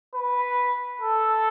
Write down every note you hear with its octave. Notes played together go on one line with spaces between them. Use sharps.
B4
A4